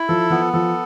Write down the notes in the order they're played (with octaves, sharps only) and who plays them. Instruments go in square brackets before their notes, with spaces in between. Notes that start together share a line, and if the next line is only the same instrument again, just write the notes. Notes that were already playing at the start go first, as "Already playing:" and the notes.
Already playing: [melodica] E4
[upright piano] F3 [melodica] A4
[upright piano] F3 [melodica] B3
[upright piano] F3 [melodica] A4